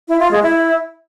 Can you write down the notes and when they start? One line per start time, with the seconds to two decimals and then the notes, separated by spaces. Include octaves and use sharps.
0.08 E4
0.20 F4
0.31 G#3
0.43 E4